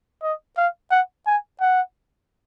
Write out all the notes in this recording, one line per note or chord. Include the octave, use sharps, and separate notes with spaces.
D#5
F5
F#5
G#5
F#5